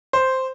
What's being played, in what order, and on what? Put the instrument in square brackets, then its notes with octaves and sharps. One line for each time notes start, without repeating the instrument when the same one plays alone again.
[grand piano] C5